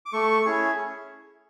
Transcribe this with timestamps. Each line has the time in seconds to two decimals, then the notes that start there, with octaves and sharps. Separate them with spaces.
0.06 D6
0.13 A3 C#6
0.46 C#4 E4 G#4